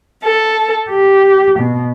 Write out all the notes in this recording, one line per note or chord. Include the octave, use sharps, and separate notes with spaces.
A4
G4
B2